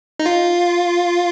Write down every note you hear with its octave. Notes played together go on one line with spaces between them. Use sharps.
D#4
F4